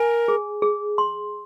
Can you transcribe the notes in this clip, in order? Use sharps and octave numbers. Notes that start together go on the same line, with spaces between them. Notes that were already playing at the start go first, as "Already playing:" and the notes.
Already playing: A#4 G#5
G#4
G#4
C6